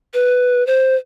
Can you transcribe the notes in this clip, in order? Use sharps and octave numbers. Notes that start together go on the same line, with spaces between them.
B4
C5